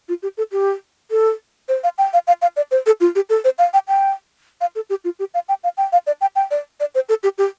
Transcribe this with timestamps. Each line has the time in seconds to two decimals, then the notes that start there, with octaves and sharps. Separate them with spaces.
0.09 F4
0.23 G4
0.37 A4
0.52 G4
1.11 A4
1.68 C5
1.84 F5
1.98 G5
2.13 F5
2.27 F5
2.42 F5
2.56 D5
2.71 C5
2.86 A4
3.00 F4
3.15 G4
3.29 A4
3.44 C5
3.58 F5
3.74 G5
3.88 G5
4.61 F5
4.75 A4
4.90 G4
5.04 F4
5.19 G4
5.34 F5
5.49 G5
5.64 F5
5.77 G5
5.92 F5
6.07 D5
6.21 G5
6.36 G5
6.51 D5
6.80 D5
6.95 C5
7.09 A4
7.23 G4
7.38 G4